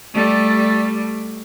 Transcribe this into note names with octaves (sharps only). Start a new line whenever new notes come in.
G3 A3